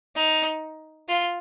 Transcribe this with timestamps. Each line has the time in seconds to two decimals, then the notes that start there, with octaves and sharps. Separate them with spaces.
0.15 D#4
1.09 F4